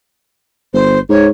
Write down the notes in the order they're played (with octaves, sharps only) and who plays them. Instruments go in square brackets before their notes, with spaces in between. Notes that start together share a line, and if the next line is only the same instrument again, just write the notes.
[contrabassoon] G1 [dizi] C5
[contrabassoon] G#2 [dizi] C#5